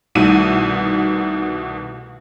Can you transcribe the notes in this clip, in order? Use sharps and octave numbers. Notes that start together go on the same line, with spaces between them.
C2 B2 D#3 A3 E4 D#7